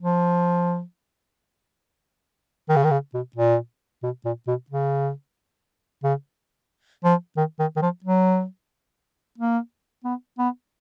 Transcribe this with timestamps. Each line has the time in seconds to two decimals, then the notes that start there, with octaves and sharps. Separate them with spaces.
0.01 F3
2.69 D#3
2.76 C#3
2.84 D#3
2.91 C#3
3.14 B2
3.36 A#2
4.03 B2
4.25 A#2
4.47 B2
4.70 C#3
6.03 C#3
7.04 F3
7.37 D#3
7.59 D#3
7.76 D#3
7.82 F3
8.04 F#3
9.38 A#3
10.04 B3
10.38 B3